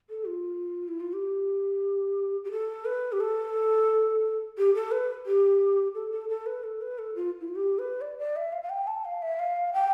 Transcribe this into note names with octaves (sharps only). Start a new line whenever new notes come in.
A4
F4
E4
F4
G4
G4
A4
B4
G4
A4
G4
A4
B4
G4
A4
A4
A4
B4
A4
B4
A4
F4
E4
F4
G4
B4
D5
D5
E5
F5
F5
G5
A5
F5
E5
F5
G5